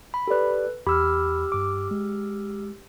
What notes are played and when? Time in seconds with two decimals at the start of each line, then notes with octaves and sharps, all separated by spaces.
0.14 B5
0.28 G4 A4 B4 D5
0.87 E2 G4 B5 E6 F6
1.52 G2 D6
1.91 G#3